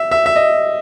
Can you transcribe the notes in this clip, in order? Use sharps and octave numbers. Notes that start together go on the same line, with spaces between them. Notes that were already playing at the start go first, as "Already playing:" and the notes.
Already playing: E5
E5
E5
D#5